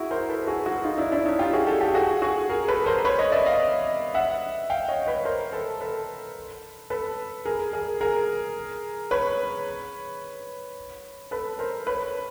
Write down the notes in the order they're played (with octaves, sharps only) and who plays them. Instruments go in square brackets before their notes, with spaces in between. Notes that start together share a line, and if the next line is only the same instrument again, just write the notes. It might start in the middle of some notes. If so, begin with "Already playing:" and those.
Already playing: [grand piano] E4 F#4 G#4
A#4 C5
A4 B4
F#4 G#4
F#4 G#4
D#4 F4
D4 E4
D4 E4
C#4 D#4
F4 G4
F#4 G#4
G4 A4
G4 A4
F#4 G#4
F#4 G#4
G#4 A#4
A4 B4
A#4 C5
B4 C#5
C#5 D#5
D5 E5
D#5 F5
E5 F#5
F5 G5
C#5 D#5
B4 C#5
A#4 C5
A4 B4
A4 B4
A4 B4
G#4 A#4
G#4 A#4
G#4 A#4
B4 C#5
A4 B4
A#4 C5
B4 C#5